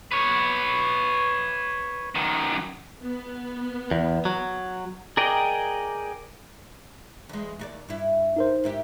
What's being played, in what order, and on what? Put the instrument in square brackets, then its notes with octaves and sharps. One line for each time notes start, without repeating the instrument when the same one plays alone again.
[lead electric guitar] B4 C#5
F#2 D#3
[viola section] B3
[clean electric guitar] E2
F#3
[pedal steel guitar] G#4 A#4 D5 D#5 G5
[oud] E2 G#3
D#2 F#4 D5
G2 E4
[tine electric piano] D#4 A#4 C5
[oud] G#2 E4 G4